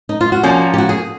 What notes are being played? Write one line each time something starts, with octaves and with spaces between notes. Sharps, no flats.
D#4
F4
F#4
F3 A#3 C#4
G4
F#4
G#4